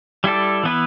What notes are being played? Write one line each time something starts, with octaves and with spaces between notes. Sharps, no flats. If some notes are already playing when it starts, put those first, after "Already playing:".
G3 E4 A4 D5
E3 B3 E4 B4